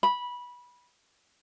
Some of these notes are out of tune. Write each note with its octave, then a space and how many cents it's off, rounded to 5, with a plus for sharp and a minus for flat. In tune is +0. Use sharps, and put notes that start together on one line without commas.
B5 -15